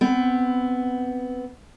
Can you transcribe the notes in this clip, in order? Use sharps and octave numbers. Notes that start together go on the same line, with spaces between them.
B3 C4